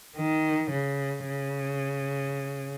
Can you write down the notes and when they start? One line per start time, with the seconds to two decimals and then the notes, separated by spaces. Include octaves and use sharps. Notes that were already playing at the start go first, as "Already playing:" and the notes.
0.17 D#3
0.71 C#3
1.27 C#3